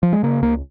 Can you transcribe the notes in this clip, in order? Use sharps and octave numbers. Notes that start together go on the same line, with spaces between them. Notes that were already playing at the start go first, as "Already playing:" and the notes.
F3
G#3
C#3 A#3
C#2 A#3